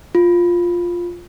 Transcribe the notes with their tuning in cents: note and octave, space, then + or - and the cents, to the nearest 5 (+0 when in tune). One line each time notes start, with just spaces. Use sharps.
F4 +5